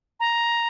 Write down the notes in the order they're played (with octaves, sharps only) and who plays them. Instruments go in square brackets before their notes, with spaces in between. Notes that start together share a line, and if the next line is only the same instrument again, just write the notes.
[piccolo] A#5